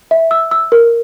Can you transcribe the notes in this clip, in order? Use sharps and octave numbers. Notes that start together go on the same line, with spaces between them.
E5
E6
E6
A#4